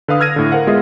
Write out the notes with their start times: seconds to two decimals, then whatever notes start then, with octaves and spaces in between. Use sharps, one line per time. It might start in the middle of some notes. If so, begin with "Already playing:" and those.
0.08 D3 B4 F5 D#6
0.20 E6 F6 G#6 A#6 D#7
0.36 A2 D3
0.52 A#4 C5 F5 F#5
0.67 G#3 B3 F4 G#4 D#5 E5